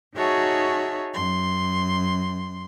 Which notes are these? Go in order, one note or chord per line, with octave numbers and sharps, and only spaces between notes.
D#4 F#4 G#4 C#5 E5 A5
F#2 C6